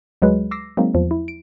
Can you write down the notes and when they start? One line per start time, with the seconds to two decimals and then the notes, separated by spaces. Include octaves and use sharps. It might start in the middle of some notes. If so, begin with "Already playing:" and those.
0.22 D2 F#3 G#3 B4
0.51 D6 E6 A#6 C7
0.77 F#3 G#3 A#3 C4 D#4
0.94 E2 F3
1.11 E4
1.28 D7